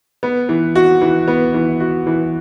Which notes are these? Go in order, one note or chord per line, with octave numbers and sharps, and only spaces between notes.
B3
E3
F#4
E3
B3
E3
F#4
E3